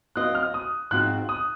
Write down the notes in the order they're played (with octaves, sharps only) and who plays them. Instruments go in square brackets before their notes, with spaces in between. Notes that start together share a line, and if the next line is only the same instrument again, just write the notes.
[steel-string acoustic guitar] F#3 C4 F4 C5 D#5 [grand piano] F#6
[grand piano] F6
D#6
[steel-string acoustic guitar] G#2 F3 C4 F#4 [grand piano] F#6
[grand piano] D#6